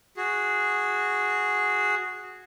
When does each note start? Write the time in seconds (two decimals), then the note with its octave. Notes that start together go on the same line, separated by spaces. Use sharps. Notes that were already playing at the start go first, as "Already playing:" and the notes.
0.17 F#4 G#4